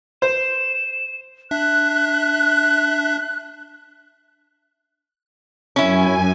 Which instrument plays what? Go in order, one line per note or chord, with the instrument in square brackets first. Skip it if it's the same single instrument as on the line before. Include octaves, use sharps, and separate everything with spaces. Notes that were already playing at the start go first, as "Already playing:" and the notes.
[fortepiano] C5 [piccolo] E7
[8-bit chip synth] D4 E5 [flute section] F#6
[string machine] F#2 G#5 [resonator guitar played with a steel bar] C#4 E4